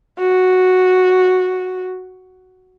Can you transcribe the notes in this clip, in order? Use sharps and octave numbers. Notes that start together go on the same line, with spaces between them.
F#4